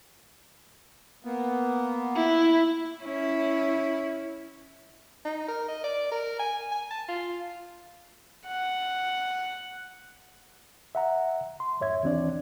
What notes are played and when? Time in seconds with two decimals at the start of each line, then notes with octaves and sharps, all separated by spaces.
1.25 A#3 B3
2.16 E4
3.03 C#4 E4
5.25 D#4
5.49 A#4
5.68 D#5
5.84 D5
6.12 A#4
6.40 G#5
6.72 G#5
6.91 A5
7.09 F4
8.47 F#5
10.95 E5 F#5 A#5
11.60 C6
11.80 F2 G#2 C#5 E5 G#6
12.03 D#2 E3 C4 D4 D5